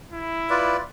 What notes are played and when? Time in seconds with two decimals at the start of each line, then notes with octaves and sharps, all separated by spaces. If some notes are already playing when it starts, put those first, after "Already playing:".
0.12 E4
0.50 F4 B4 D5